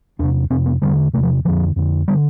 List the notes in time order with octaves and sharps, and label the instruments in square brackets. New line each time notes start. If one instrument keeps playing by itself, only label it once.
[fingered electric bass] E2 C3 D4
F2 C3 C4
B3
E2 D3 G3
E2 C3 A3
F3
F2 D3 F3
F2 D3
D3 G3